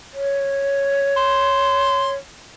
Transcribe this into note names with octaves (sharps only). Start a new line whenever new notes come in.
C#5
C6